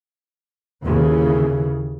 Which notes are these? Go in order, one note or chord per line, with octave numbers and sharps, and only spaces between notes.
D#2 C#3 E3